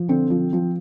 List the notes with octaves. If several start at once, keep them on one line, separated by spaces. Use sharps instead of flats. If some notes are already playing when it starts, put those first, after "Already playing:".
Already playing: F3
D3 C4
F3
F3